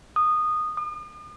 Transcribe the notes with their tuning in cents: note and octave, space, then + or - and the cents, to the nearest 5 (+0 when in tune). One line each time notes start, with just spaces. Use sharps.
D#6 -15
D#6 -45